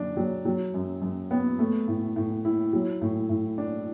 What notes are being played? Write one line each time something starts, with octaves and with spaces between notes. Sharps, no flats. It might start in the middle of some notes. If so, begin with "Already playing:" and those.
Already playing: F#2 D3 D4
F#3
F#3
F#2
F#2
B3
A3
A2
A2
E4
F#3
A2
A2
D4